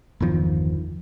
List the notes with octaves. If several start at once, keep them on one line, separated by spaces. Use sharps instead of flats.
G1 E2 D#3 F3